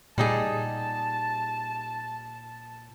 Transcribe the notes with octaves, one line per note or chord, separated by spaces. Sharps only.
A#2 G3 D#4 G#4 A5